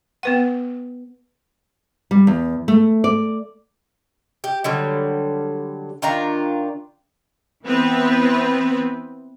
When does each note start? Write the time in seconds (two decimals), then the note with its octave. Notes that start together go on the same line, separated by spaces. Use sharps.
0.23 B3 B4 F#5
2.11 G3
2.27 E2
2.68 A3
3.04 D5
4.44 G4
4.64 D3 F#3 G3
6.02 D#3 D4 F4 A#5
7.65 E3 B3 C4 B4